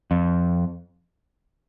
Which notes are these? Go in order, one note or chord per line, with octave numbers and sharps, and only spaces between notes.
F2